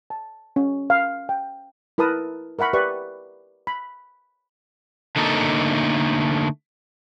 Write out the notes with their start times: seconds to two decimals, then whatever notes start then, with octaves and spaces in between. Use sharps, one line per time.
0.10 A5
0.56 C#4
0.90 F5
1.29 G5
1.98 E4 A#4 B4 A5 D#6
2.59 A#4 E5 F#5 B5 C#6
2.73 G4 B4 D5 E5 C#6
3.67 B5
5.16 D3 A3 A#3 D#4 A4